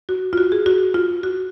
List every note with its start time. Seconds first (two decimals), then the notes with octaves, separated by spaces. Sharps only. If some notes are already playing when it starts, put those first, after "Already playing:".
0.09 F#4
0.33 F4
0.37 F#4
0.52 G#4
0.66 F#4
0.94 F4
1.23 F#4